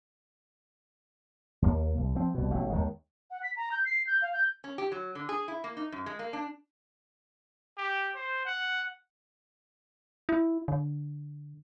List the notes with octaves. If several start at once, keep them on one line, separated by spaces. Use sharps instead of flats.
D#2 A#3
C2
F3 C4
C2 B2
A1 B2 A3
D#2 D#3 G#3
F#5
B6
A#5
G6
C7
G6
F5
G6
C#4
G4
F#3
D3
G#4
E4
A#3
D#4
F#2
G#3
A#3
D4
G4
C5
F#5
E4
D3